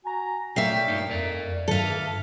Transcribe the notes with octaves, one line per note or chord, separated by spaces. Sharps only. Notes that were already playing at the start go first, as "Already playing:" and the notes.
F#4 G#5 A#5
A#2 A3 C#5 D5 E5 F5 G5
G2 A#3 D#4
F2 A#4 D5
G2 D#3 A4 E5 F5